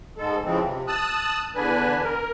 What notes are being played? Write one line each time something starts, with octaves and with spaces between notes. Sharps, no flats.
G#2 G#3 A4
F2 C#3 E3 F3 G#3 C4
C3
A5 D#6 E6 F#6
E2 D3 D4 B4 G#5
A#4